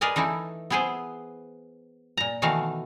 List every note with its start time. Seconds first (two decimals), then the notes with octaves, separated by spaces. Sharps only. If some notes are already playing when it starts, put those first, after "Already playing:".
0.01 G#4 A#4 B4 D5 D#5 G#5
0.16 E3 A3 D#4 E4
0.70 B3 E4 G#4 B4 C5
2.17 A#2 A#5
2.42 B2 D#3 E3 A3 F#4 F5